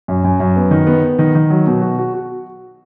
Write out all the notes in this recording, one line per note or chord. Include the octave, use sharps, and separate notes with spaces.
F#2
F#2
F#2
B3
D#3
B3
B3
D#3
D#3
F#3
B2
F#4
F#4
F#4